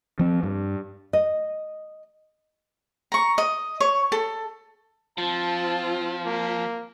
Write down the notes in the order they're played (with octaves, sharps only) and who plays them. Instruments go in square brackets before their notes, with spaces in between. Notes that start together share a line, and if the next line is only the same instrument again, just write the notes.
[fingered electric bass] F3 C4
G2
[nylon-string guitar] D#5
[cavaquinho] A#5 C#6
D#5
C#5
A4
[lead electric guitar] F3 [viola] C4 F4 [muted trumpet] A5
[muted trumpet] A#3